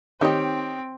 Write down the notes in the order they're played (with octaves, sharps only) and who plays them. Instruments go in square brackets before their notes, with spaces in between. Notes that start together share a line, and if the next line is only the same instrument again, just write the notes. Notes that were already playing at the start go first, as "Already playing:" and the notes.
[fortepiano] D#3 G4 C#5 [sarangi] C4 [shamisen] D#4 D#5